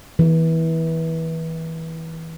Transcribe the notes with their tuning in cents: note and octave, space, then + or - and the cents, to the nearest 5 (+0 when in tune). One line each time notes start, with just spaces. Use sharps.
E3 -25